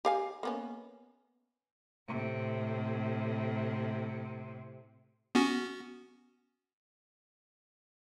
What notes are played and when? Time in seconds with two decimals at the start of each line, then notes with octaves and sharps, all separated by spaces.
0.05 G4 F5 G#5
0.43 A#3 B3 C#4
2.08 A2 C3
5.35 B3 C#4 F#4